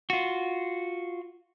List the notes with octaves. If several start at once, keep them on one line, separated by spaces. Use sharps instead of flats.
F4 F#4